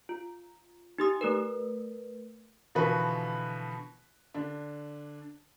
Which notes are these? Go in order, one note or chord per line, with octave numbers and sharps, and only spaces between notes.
F4
D#4 G4 D#6
A3 A#4 B4
B2 D3 E3 F3 F#4 B4
D3 D4